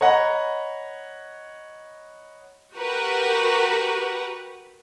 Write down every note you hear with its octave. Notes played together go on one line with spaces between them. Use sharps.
C#5 D#5 F#5 A#5 B5
F#4 G4 A#4 B4 F#5